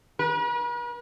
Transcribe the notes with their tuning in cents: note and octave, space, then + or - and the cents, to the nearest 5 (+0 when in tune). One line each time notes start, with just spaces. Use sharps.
B4 -45